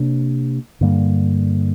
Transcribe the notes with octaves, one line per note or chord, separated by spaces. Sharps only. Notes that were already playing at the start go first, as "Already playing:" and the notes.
Already playing: C3 A#3 D4
G2 D3 G3 A#3